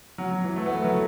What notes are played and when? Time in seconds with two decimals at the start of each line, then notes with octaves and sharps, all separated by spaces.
0.18 F#3
0.31 F#3
0.44 E3
0.56 A3
0.66 B3
0.76 A3
0.85 F#3